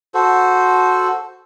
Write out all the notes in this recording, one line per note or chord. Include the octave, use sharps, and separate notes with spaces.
F#4 A4 C5